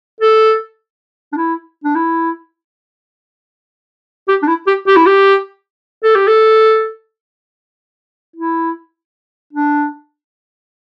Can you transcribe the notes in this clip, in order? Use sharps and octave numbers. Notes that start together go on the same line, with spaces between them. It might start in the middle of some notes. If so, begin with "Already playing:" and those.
A4
D4
E4
D4
E4
G4
D4
E4
G4
G4
E4
G4
A4
G4
A4
E4
D4